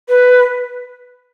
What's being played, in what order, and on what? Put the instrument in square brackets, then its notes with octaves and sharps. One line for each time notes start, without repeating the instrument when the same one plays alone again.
[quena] B4